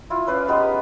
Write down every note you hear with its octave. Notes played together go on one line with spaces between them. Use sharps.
E4 F4
C#4 B4 D5 F5
G#3 B3 D#4 G4